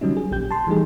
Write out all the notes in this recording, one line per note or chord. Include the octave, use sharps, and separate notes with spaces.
D3 F#3 G3 C#4 D#4
G#4
A#1 A#2 G4 G6
A5 C6
E3 G3 A3 D#4 G#4